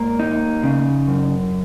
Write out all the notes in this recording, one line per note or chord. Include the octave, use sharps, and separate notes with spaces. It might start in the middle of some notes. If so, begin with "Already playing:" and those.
Already playing: G#2 A#3
D#4
C#3
F#2